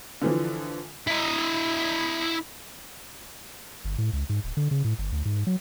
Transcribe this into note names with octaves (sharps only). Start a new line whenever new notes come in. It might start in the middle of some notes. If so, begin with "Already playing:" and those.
D3 E3 F3
E4 D#5
G1
A2
C#2
G#2
D1
D3
C#3
A2
G1
D2
G#2
F#3